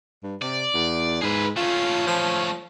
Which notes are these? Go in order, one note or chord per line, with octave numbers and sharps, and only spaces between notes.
G2
C3 D5
E2
G#2 G#4 B4
A3 C#4 F4
F3